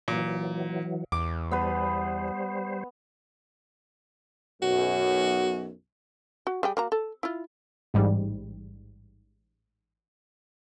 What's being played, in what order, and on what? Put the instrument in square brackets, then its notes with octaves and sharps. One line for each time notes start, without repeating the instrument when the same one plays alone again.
[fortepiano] A#2 [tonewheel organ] E3 F#3
[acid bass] E2 [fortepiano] D6
[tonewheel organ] G3 C5 [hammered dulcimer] B3 B4
[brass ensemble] B1 F#2 [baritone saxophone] F#4
[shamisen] F#4
G3 G#4 G5
A#3 F#4 A#5
A4
E4 F4
[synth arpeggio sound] A1 G#2 G3